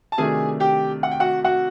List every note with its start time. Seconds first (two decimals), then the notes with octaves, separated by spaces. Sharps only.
0.12 A5
0.18 C3 D#3 F#3 A3 D4 G#4 G#5
0.60 G4 G5
1.03 F#5
1.11 G5
1.20 F#4 F#5
1.45 F#4 F#5